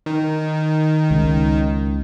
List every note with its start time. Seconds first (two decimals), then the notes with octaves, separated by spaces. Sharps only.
0.06 D#3
1.11 C#2